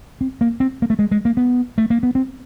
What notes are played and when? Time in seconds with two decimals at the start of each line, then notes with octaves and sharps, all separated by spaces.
0.21 C4
0.41 A#3
0.60 C4
0.82 A#3
0.90 A3
0.99 G#3
1.11 G#3
1.25 A#3
1.37 B3
1.78 A3
1.90 A#3
2.03 B3
2.15 C4